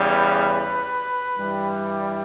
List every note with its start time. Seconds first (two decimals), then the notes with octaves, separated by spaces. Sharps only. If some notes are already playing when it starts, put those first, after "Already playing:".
Already playing: E2 C#3 G3
0.09 B4
1.37 G2 E3 G3